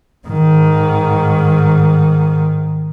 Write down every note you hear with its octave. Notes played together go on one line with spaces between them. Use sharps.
G#2 D#3